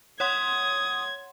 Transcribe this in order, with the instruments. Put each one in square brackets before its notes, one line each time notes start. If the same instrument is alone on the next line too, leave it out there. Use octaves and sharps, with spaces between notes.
[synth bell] C#5 F#5 C6 [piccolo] D#6 [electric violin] G#6